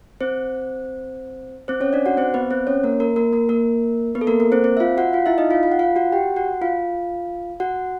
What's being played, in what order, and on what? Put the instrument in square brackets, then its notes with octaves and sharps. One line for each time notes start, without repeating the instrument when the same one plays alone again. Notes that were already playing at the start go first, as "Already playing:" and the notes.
[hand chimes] C4 C5
C4 C5
C#4 C#5
D4 D5
F#4 F#5
C4 C5
B3 B4
C4 C5
C#4 C#5
A#3 A#4
A#3 A#4
A#3 A#4
A#3 A#4
A#3 A#4
B3 B4
A4
A#3 A#4
A#3 A#4
C4 C5
C4 C5
E5
F4 F5
F#4 F#5
F4 F5
E4 E5
D#4 D#5
F4 F5
F4 F5
F#5
F4 F5
F#4 F#5
G4 G5
F#4 F#5
F4 F5
F#4 F#5